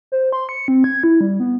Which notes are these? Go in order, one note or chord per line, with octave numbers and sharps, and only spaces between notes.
C5
C6
C#7
C4
G#6
E4
G3
B3